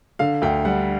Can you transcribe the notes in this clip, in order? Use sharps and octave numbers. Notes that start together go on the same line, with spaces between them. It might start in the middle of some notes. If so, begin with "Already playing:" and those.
D3 F5
D2 G5
G3 F#5